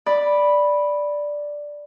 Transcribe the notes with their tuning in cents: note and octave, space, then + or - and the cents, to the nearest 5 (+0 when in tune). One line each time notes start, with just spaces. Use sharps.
D5 +0 B5 -5